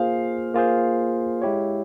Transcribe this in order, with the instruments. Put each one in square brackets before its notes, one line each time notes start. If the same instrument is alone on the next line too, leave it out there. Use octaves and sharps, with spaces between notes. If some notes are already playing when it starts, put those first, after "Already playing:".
Already playing: [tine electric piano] A#3 F4 G#4 C5 [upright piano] F5
[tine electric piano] A#3 F4 G#4 C5
G#3 E4 G4 C#5